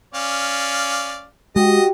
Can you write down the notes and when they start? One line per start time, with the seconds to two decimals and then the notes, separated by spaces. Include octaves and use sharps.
0.14 C#4 D5 F5
1.56 G#3 F#4 G4 D#5